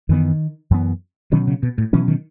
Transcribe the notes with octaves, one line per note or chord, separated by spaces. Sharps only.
F#2 D#3 E3 B3
F#2 E3 B3
B2 D#3 F#3 C#4
C#3
B2
A2
B2 E3 F#3 C#4
D#3